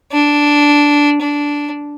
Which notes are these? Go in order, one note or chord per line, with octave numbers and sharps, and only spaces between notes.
D4
D4